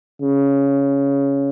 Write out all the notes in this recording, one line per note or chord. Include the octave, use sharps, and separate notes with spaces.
C#3